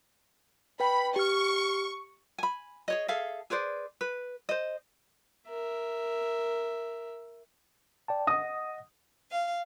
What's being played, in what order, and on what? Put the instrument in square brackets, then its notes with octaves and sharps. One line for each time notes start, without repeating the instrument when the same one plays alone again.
[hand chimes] B4 G5 [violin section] B5
[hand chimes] G4 F6 [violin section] C#6
[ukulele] G#5 B5
G#4 C#5 D#5
G#4 A4 E5 F5
G#4 B4 C5 D5
B4
C5 D#5
[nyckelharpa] A#4 E5
[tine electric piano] D5 G5 A5
[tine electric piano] D#5 F#5 A#6 [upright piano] D#6
[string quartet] F5